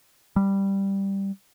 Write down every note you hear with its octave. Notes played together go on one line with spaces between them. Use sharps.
G3